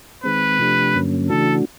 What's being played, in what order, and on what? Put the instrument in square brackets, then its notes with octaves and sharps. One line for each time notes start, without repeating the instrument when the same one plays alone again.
[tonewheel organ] D#3 G#3 C4 [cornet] B4
[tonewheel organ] C3 F3 A3 D4 G4
G2 D3 F#3 A#3 C#4
[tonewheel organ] C#3 E3 A3 D4 F#4 [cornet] A4